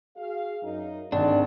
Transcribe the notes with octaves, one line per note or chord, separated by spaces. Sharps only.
F#4 G#4 F5
F#2 D#4
G#1 D2 G#3 D4